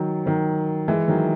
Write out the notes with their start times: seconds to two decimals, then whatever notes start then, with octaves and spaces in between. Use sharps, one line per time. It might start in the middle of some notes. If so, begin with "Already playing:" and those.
Already playing: D#3 F#3
0.26 D#3 F#3
0.88 E3 G#3
1.08 D#3 F#3